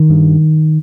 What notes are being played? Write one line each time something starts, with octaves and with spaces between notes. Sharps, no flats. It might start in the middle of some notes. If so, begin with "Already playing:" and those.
Already playing: D#3
G2